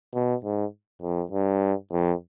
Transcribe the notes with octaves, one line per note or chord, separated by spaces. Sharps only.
B2
G#2
F2
G2
F2